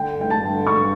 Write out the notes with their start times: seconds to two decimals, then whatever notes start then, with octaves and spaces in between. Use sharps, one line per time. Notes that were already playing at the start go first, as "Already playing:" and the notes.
Already playing: D3 G5
0.12 G2
0.21 G5
0.30 G2 A5
0.48 D3
0.66 G2 C#6